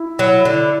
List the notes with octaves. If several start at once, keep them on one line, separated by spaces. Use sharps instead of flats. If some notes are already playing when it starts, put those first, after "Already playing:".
Already playing: E4
F#3
D3